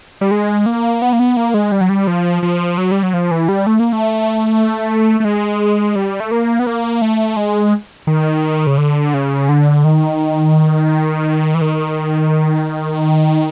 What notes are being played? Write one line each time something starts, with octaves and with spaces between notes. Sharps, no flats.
G3
G#3
A#3
B3
A#3
B3
A#3
G#3
G3
F#3
G3
F3
F3
F#3
G3
F#3
F3
E3
G3
A3
A#3
A3
A3
G#3
G3
A3
A#3
B3
A#3
A3
G#3
D#3
C#3
D3
C#3
D3
D#3
E3
D#3